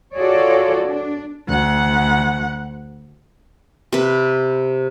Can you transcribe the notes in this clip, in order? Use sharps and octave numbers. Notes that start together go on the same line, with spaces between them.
F4 F#4 G#4 A4 C#5 D5
D4
D2 F#5
C3 B4